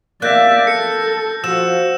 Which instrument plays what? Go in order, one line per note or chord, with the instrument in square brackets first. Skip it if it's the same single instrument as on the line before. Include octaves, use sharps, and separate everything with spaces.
[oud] A#3 [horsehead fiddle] D5 E5 [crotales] F#6 G6 A#6
[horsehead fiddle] A4 [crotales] C#7
[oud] F3 [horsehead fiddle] F#4 [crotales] E6 E7